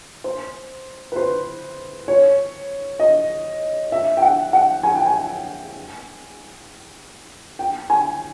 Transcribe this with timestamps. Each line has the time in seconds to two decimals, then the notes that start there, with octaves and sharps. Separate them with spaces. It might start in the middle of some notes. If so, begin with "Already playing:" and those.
0.24 C5
1.12 B4
1.16 C5
2.08 C#5
2.99 D#5
3.92 E5
4.17 G5
4.22 F#5
4.53 F#5
4.83 G#5
4.95 G5
5.06 G#5
7.59 G5
7.90 G#5